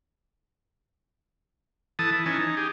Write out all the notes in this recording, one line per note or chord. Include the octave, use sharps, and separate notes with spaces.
E3 A4 A5 D#6
E4
E3 C#4 D#4 G#5 A5
D#4
G4 G#4